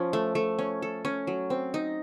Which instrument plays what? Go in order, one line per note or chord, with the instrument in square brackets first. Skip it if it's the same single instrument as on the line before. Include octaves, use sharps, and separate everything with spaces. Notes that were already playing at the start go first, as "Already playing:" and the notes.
Already playing: [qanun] F3 C#4
A3
A3
C#4
A4
C#4
F#3
C4
D#4